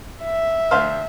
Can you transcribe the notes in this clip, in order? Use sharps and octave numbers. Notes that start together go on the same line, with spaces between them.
E5
D2 C5 F5